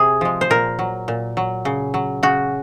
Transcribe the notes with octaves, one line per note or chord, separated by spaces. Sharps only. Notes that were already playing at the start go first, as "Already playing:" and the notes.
Already playing: C3 G#4
F3 G#3
C5
A#2 A#4
F#3
A#2
F#3
C#3
F#3
C#3 F#4